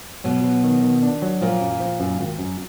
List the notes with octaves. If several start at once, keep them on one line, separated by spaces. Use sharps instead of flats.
B2 F#3 B3
F#3
D#3
D#3
D4
F#3
A#2 F3 A#3
F#2
F3
F#2
G#1
F#2